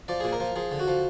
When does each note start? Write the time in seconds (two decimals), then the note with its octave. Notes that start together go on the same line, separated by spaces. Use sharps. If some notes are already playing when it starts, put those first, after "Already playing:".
0.08 F3 D5
0.20 A#2 G#4
0.32 A#4
0.40 F3
0.56 F3 G#4
0.71 D3
0.79 F#4
0.88 F3